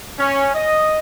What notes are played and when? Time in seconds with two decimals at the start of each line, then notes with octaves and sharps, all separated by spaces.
0.19 C#4
0.54 D#5